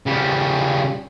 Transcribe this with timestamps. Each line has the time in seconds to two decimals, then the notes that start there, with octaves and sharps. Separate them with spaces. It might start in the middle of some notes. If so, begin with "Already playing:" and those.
0.06 C#3 G3